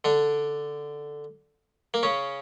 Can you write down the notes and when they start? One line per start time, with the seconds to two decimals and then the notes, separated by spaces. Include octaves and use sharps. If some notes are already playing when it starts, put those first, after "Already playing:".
0.04 D3 D4
1.94 A#3
2.03 C#3 C#4